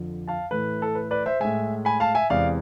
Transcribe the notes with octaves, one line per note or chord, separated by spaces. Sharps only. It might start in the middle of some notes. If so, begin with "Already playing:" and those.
Already playing: F2 D3 F3
F5 A5
A2 E3 A3 B4
A4
B4
B4 D5
C5 E5
A2 G#3 E5 G#5
G#5 B5
F5 A5
E5 G#5
E2 C3 G#3 D5 F5